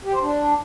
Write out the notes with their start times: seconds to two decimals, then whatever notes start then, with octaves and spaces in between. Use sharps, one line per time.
0.05 G4
0.14 C5
0.22 D4